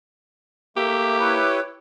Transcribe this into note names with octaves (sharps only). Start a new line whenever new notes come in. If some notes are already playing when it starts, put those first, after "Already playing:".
A3 A#3 G4 E5
E4 B4 C#5